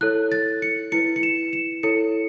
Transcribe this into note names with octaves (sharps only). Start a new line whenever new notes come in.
E4 A4 C#5 F#6
A6
C#7
E4 B4 C#7
C#7
E7
E7
E4 A4 C#5 C#7